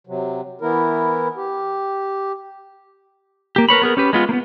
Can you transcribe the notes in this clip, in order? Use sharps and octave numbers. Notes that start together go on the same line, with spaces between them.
C3 F#3
E3 B3 E4 A#4
G4
A#3 G4
A#4 B4 C#5 B5
B3 G#4 A#4
C#4 G4 B4
G#3 B3 F4
A#3 B3